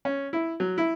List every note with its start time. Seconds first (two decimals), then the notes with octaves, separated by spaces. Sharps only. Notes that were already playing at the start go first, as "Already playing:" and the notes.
0.05 C#4
0.33 E4
0.60 F#3
0.78 E4